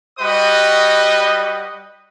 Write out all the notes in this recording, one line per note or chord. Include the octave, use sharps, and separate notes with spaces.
G3 F#4 B4 D#5 D#6